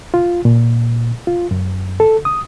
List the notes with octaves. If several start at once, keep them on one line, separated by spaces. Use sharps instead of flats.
F4
A#2
F4
F#2
A4
D#6